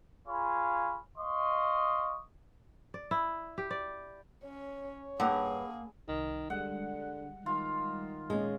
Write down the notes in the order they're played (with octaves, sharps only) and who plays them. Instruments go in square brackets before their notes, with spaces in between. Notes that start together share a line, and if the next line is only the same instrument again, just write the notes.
[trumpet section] F4 G#4 C#5 F5 B5
D#5 F5 C6 C#6 D#6
[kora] D5
E4
G4
D5
[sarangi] C#4 [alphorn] C#5
[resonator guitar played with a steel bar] G2 [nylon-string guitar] A#3 F#5 [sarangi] G#4
[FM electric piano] C2 [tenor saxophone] D#3
[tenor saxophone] D3 [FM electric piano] G3 G#3 [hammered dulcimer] F#5
[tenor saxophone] D#3 [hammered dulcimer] F4
[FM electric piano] A#2 D#5 [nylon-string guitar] G#3 C#4